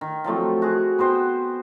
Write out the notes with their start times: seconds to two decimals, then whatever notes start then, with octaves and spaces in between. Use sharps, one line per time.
0.01 D#3
0.24 F3 F#3 A3 C4
0.62 F#4 G#4
0.99 B3 F#4 C5 G5